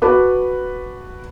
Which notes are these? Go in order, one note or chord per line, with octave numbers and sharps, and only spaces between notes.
F#4 B4 A5 B5 D6